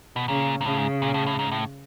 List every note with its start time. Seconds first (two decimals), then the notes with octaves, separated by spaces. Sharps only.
0.16 B2
0.28 A#2 C#3
0.61 A#2
0.65 A2 C#3
0.77 G#2
1.02 A#2
1.14 A2
1.26 A2
1.39 G#2
1.51 A2